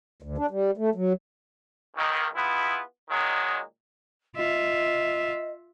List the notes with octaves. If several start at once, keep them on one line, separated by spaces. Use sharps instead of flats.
D2
D4
G3
A3
F#3
C#2 D#3
B3 E4 F4 G#4
A#2 D#3 F#3 G#3
F4 D#5 E5